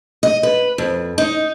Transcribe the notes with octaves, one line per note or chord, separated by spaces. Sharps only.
D#5
B4
F2
D#4